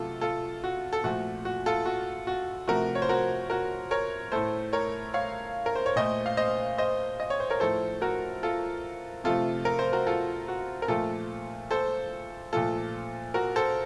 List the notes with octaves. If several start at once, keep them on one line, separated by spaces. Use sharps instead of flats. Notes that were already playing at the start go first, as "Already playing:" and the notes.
Already playing: C3 F#3 A3 F4 A4
F4 A4
F#4
A4
A#2 F3 A3 F#4
F#4
F4 A4
F#4
F#4
C3 F3 A3 F#4 A#4
C#5
C5
F#4 A#4
F#4 A#4
A#4 C#5
A2 A3 A4 C5
A#4 C#5
C#5 F5
A#4
C5
C#5
A#2 A3 C5 D#5
F5
C5 D#5
C5 D#5
D#5
C#5
C5
A#4 C#5
A2 F3 A3 A4 C5
F#4 A#4
F4 A4
C3 F3 A3 F4 A4
A#4
C5
F#4 A#4
F4 A4
F#4
A#4
A#2 F3 A3 F4 A4
A4 C5
A#2 F3 A3 F4 A4
F#4 A#4
A4 C5